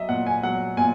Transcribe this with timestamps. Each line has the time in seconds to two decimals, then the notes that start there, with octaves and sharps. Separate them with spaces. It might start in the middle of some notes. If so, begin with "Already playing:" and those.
Already playing: F#3 D#5 E5
0.09 A#2 F#5
0.27 G#5
0.43 F#3 F#5
0.77 A#2 G#5